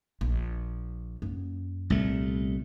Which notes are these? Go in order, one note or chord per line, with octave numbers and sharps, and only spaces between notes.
A#1
F#2 A#3
C2 A#2 A3 B3